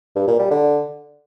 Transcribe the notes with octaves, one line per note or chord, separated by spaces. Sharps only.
G2
A#2
G3
D3